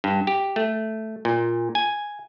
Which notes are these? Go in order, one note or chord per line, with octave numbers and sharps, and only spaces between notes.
G2
G4
A3
A#2
G#5